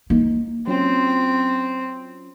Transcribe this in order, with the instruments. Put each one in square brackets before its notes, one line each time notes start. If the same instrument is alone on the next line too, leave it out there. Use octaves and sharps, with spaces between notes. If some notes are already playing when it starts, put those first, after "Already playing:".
[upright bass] A#3 [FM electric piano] D#4
[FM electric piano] F#3 C#4 F4 [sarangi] C4